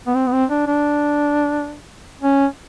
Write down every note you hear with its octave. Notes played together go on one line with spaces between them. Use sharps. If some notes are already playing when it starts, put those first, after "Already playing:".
B3
C4
B3
C4
D4
D4
C#4